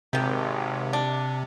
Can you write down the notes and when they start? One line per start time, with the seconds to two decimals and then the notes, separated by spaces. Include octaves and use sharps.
0.13 G#1 C3 D#3 G4
0.93 D4